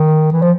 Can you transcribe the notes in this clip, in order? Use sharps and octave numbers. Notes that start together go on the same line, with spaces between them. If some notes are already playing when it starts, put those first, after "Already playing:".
Already playing: D#3
E3
F3